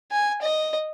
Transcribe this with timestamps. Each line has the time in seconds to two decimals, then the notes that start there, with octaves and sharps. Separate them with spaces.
0.11 G#5
0.42 D#5